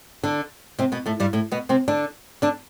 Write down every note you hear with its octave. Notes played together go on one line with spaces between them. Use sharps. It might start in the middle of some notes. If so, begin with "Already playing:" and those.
D3 D4
C3 C4
B2 B3
A2 A3
G2 G3
A2 A3
B2 B3
C3 C4
D3 D4
D3 D4